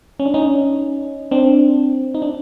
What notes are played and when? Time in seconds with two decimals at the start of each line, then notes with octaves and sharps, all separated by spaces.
0.20 C#4
0.26 D4
0.34 C#4 D#4
1.31 C4 D4
2.15 D#4
2.22 D4